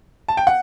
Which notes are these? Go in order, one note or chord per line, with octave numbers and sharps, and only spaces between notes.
A5
G5
F#5